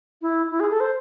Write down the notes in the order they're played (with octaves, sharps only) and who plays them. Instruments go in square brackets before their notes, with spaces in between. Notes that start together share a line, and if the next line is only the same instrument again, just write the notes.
[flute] E4
E4
G#4
A4
C5